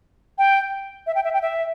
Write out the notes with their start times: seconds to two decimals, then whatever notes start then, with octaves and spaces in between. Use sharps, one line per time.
0.38 G5
1.07 E5
1.15 G5
1.24 E5
1.33 G5
1.42 E5